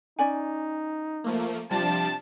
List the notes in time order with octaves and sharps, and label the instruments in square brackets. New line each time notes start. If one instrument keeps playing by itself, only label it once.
[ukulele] C#4 D5 G#5 [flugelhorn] D#4
[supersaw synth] F3 A3 A#3
[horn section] C3 A5 [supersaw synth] F3 G3 D4 [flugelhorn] F4